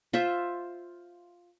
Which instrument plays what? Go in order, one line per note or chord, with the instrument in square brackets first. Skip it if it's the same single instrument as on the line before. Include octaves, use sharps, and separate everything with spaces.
[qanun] F4 C5 E5